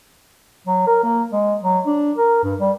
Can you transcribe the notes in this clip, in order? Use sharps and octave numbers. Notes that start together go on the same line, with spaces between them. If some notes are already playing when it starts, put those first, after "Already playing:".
F#3
A#4
A#3
G#3
F#3
D4
A#4
G2
G3